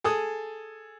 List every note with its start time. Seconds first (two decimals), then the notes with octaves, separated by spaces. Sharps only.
0.04 G#4 A4 D#6